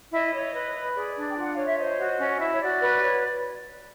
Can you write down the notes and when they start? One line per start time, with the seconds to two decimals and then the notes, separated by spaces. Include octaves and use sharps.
0.11 E4 D#5
0.32 C#5
0.53 B4
0.74 B4
0.94 G#4 D5
1.15 D4
1.28 G5
1.35 F4 F#5
1.52 C#5 F5
1.65 E5
1.77 C5 D#5
1.97 F#4
2.19 C#4
2.39 E4
2.54 C#5
2.60 F#4 D5
2.80 B4
3.01 C#5